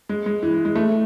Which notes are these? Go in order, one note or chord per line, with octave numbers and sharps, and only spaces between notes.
G#3
G#3
E3
E3
G#3
A3